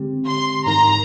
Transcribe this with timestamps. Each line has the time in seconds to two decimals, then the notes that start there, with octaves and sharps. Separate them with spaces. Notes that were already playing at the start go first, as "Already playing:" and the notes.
Already playing: D3 G#3 C4 G4
0.27 C6
0.66 G#2 D#3 G#3 D#4 A#4 A#5